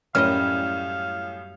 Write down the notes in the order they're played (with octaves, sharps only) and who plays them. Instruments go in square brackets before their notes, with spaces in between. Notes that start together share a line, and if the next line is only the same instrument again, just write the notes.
[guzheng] F#2 G3 D#5 [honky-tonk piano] A2 C#4 [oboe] F5 [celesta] F6